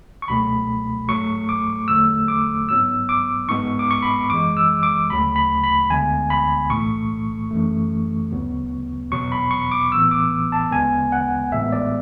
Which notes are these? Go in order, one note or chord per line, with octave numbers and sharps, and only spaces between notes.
C#6
C#2 B2 F#3 A3 B5
G#2 F#3 A3 C#6
D6
E2 D3 F#3 A3 E6
D6
G#2 F#3 B3 E6
D6
G#2 G#3 B3 C#6
D6
C#6
B5
F#2 E3 G#3 D6
E6
D6
D2 C#3 F#3 A3 B5
B5
B5
D2 D3 G#3 B3 G#5
B5
B1 A2 E3 A3 C#6
F#2 E3 A3
D2 C#3 F#3 B3
E2 B2 F#3 B3 C#6
B5
C#6
D6
A1 A2 E3 B3 E6
D6
A5
D2 C#3 G#3 B3 G#5
F#5
A1 A2 G#3 B3 E5
D5